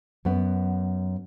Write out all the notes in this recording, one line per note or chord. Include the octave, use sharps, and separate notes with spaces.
F#2 B3